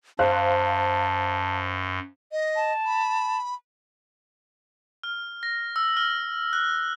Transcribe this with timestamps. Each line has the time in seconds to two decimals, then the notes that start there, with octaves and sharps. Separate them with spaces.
0.19 F#2 C5 F5 A5 F#6
2.32 D#5
2.56 A5
2.86 B5
5.03 F6
5.43 A#6
5.76 E6
5.97 F6
6.53 F#6